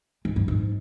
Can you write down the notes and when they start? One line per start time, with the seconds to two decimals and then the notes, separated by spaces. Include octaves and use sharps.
0.25 G#2
0.36 G2
0.48 G#2